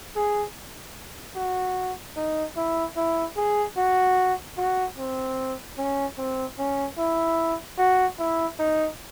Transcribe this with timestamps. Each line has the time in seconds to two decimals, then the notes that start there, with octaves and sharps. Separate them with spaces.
0.16 G#4
1.36 F#4
2.16 D#4
2.57 E4
2.97 E4
3.37 G#4
3.77 F#4
4.57 F#4
4.98 C4
5.78 C#4
6.18 C4
6.59 C#4
6.98 E4
7.78 F#4
8.19 E4
8.59 D#4